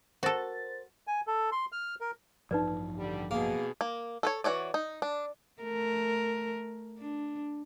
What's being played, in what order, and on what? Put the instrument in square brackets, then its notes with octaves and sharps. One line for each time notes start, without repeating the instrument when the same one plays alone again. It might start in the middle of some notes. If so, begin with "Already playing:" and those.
[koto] F#4 A4 [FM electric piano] A#4 C5 A6
[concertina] G#5
A4
C6
F6
A#4
[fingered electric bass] A1 G2 F3 [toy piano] D#4 B4 D5
[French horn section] D3 G3
[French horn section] B2 G#4 [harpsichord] A#3
[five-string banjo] A#3
A4 B4 C#5
E3 F#4 C#5 D5
D#4
D4
[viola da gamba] A3 A#4
D4